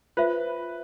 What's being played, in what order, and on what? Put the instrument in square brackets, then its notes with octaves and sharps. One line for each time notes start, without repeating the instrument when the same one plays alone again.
[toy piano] F4 C5 E5 [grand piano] B4